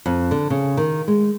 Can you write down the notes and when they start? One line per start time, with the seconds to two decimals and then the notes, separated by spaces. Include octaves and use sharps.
0.06 F2
0.31 D3
0.50 C#3
0.77 D#3
1.08 G#3